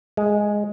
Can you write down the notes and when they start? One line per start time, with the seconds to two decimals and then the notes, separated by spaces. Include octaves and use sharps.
0.17 G#3